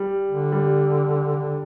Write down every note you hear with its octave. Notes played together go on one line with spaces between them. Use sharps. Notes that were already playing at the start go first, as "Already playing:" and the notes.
Already playing: G3
D3
G3
D3